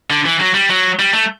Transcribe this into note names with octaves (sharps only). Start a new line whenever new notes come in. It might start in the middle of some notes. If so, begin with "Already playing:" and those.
D3
E3
F#3
G3
F#3
G3
A3